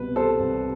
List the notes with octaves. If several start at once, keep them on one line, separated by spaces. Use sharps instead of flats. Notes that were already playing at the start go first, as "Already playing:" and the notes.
Already playing: C2 B2 B4
G3 A4 C5
C2